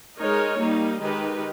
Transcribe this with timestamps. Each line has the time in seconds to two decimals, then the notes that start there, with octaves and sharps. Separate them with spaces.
0.19 G#3 D#4 A#4 C#5
0.60 G3 A#3 D#4
1.01 D#3 G#3 D#4 G4 B4